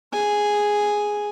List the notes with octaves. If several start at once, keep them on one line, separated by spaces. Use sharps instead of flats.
G#4 G#5